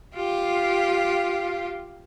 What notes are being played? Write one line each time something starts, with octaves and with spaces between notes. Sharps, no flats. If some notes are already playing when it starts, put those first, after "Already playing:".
F4 G4